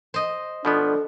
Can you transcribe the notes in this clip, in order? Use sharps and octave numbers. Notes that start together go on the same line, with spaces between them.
C5 D#5
B2 F3 B3 D4 A4